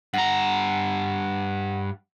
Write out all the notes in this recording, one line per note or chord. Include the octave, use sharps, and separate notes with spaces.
G2 F#5 A#5